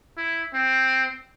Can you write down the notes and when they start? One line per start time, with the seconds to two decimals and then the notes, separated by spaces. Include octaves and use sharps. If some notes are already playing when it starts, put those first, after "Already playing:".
0.17 E4
0.54 C4